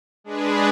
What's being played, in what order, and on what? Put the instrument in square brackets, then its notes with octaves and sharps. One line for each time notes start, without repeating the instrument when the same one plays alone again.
[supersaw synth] G#3 D4 G#4 B4